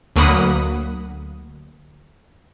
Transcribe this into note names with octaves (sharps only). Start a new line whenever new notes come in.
D2 F#3 A#3 F#5 B5 D#6